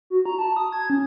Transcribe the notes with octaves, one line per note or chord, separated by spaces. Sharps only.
F#4
A#5
A5
D#6
G#6
C#4